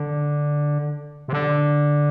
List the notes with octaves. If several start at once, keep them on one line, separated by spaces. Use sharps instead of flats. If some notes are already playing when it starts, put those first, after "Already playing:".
Already playing: D3
C3
D3